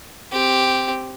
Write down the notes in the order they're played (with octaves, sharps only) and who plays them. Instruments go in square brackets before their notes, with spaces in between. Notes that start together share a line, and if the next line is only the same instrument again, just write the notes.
[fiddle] C4 G4